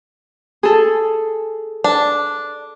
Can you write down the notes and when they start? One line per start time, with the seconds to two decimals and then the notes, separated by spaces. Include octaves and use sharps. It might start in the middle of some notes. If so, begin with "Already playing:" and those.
0.63 G#4 A4
1.84 D4